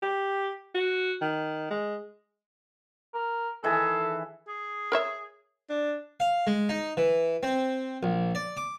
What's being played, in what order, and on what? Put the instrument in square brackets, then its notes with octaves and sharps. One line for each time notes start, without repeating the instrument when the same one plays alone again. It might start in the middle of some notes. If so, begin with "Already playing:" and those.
[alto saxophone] G4
F#4
D#3
G#3
[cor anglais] A#4
[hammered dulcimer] D#3 E3 G#4 [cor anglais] A4
[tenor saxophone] G#4
[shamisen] A#4 C#5 E5
[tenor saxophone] D4
[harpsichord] F5
G#3
D#4
E3
C4
A#1
D5
D6